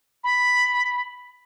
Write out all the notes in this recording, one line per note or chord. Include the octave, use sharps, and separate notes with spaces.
B5